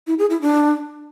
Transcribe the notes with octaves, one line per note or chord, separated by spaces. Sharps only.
E4
G#4
E4
D4